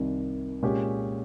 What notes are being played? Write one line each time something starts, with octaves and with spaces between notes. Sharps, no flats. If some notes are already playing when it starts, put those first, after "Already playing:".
Already playing: C2 C3 D#3
A#2 G#3 C#4 G4